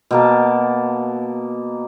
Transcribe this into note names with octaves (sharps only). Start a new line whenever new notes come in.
B2 A#3 A5